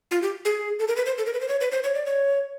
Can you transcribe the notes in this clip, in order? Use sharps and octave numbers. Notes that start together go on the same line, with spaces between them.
F4
G4
G#4
A4
A#4
B4
C5
A4
A#4
B4
C5
C#5
B4
C5
C#5
D5
C#5